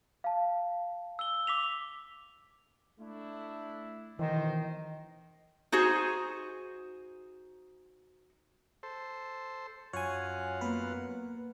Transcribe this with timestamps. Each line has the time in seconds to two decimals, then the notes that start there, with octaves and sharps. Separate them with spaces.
0.24 F5 A5
1.19 E6 G7
1.47 D6 B6 F7
3.00 A3 D4 E4
4.19 B1 D#3 E3 C5 D#5
5.72 D#4 F#4 G#4 C5
8.83 A4 C5
9.93 F#2 F4 C#5 F#5 G#5
10.61 A#3 B3 B4